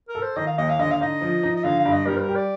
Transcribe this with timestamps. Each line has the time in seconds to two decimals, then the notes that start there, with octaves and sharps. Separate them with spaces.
0.09 A#4
0.15 A4
0.22 C5
0.36 D#3 D#5
0.47 F5
0.58 D#2 D#5
0.70 F5
0.79 D3 D#5
0.91 F5
1.01 D#4 D#5
1.21 F3
1.43 D#4
1.56 D#5
1.64 D3 F5
1.79 F5
1.85 G2
1.92 D#5
2.06 G3 A#4
2.17 C5
2.21 A#4
2.29 G4
2.35 D5